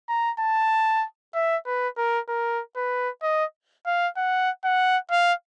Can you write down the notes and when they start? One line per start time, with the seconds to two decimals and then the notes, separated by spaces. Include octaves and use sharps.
0.09 A#5
0.40 A5
1.35 E5
1.66 B4
1.97 A#4
2.29 A#4
2.76 B4
3.23 D#5
3.86 F5
4.17 F#5
4.64 F#5
5.11 F5